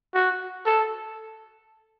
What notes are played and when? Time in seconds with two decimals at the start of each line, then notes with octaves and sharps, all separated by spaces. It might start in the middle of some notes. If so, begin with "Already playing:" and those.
0.14 F#4
0.66 A4